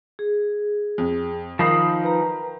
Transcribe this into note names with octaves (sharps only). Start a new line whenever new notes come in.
G#4
F2
D#3 F3 D#4 B5 C7
B4 A#5